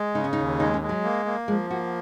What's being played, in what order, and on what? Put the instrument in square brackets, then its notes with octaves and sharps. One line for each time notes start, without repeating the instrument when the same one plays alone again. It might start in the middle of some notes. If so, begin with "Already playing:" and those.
Already playing: [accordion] G#3
[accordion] C#3 [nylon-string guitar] D#4
[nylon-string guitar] C#4
D#4
[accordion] D#2
[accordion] G#3 [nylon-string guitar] D#4
[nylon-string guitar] C#4
[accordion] G#3
[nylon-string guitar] F#3
[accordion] A#3
A#3
[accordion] F3 [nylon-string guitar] G#3
[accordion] A#3 [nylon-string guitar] F#4